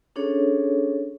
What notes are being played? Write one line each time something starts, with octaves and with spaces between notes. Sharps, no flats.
C#4 D4 G#4 A4 C#5